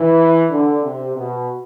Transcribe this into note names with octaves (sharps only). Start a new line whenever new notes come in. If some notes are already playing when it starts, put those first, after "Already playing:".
Already playing: E3
D3
C3
B2